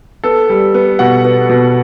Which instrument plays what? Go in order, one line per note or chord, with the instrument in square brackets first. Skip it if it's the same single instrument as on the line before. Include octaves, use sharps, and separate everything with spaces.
[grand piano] B3 A4
G3
B3
B2 F#5
B3
B2